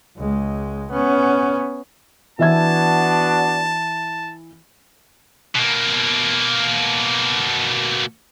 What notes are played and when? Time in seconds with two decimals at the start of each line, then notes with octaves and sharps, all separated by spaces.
0.17 C#2 G#3
0.91 B3 C#4
2.39 E3 B3 D4 F#4 E5 A5 G#6
5.55 B2 A#3